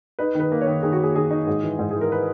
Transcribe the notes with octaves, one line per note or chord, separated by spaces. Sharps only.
D#4 B4
D#3
B4
A#3
C#5
D#3
D#3 G#4
F#4
A#3 G#4
D#3 G#4
D#4
G#2
E3
G#2
E3 G#4
A#4
B4